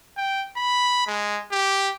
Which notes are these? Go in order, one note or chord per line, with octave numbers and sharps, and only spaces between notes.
G5
B5
G#3
G4